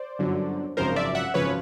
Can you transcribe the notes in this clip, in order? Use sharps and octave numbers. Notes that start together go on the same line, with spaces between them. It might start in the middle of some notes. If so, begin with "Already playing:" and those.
Already playing: C5 D5
G1 F#2 D3 F#3
G#1 F#2 C#3 F3 A#4 C5
D5 E5
E5 F#5
G#1 F#2 C#3 F3 B4 C#5